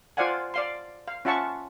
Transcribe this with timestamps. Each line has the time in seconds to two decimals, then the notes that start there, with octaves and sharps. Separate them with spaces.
0.17 F4 C5 D5 F5 F#5 G#5
0.54 D5 F5 C6
1.08 F5
1.25 C#4 F4 E5 F#5 A5 C#6